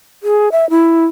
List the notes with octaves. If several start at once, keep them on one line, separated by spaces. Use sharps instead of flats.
G#4
E5
E4